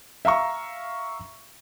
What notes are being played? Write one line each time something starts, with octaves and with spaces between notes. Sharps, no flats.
E5 F5 A#5 C#6